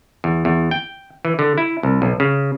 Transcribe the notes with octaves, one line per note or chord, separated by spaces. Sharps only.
E2
E2
G5
E3
D3
E4
C2
B1
C#3